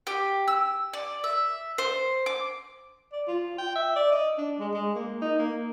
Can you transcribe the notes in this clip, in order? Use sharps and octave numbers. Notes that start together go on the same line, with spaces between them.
G4
E6
D5
E5
C5
D6
D5
F4
G5
E5
D5
D#5
D4
G#3
G#3
A#3
D#4
A#3